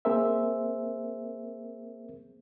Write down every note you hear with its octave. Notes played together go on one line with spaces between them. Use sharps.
A#3 C4 G#4 A#4 C5 E5